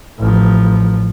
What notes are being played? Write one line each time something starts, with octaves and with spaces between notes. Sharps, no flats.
A1 F3